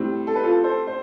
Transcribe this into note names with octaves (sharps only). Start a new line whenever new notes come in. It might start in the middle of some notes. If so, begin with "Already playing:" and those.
Already playing: A2 G3 C4
A4
B4
F4 A4
A4 C5
C5